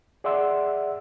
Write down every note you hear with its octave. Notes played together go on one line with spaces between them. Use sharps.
G#4 D5 E5 F#5 C6 E6